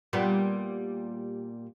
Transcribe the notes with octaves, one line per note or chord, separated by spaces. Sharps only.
A#2 G3 B3